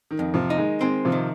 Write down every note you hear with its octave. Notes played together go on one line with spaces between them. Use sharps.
D#3
F2
C3 F3
D#4
D#3 G#3
D#3 G#3 C4
C3 F3
D#3